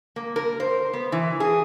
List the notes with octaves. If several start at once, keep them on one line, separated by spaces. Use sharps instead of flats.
A#3
A#4
C5
B3
E3
G#4